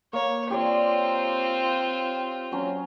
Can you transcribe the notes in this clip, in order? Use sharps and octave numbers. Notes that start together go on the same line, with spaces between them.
A#3 C#5
C4 F4 G4 C#5 D5
F#3 C#4